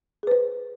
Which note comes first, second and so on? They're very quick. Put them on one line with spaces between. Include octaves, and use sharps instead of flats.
G#4 B4 C5